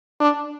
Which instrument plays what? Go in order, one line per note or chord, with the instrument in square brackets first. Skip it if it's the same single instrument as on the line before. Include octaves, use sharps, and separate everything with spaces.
[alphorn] D4